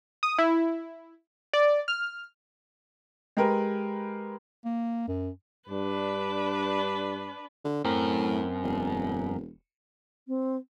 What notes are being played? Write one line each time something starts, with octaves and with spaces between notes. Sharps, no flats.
D#6
E4
D5
F6
G#3 G4 A#4 B4
A#3
F#2
G2 D4 B4
D3
F#2 A2 C4 A#4
E1
C4